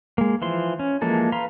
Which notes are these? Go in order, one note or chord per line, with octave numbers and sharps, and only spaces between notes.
G#3 A#3
E3 F3 C6
C#4
E3 F3 G#3 A#3 A4
B4 F5 A#5 C6